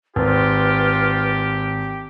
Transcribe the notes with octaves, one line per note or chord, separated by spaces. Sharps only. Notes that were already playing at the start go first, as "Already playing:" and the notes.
G#1 F4 G4 B4